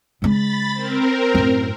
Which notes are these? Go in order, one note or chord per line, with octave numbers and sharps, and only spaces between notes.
C#3 G#3 B5 A6
C4 A#4
F#2 A2